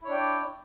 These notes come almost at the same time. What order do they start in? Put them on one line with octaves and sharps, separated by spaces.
E4 C#5 D4 G5 D5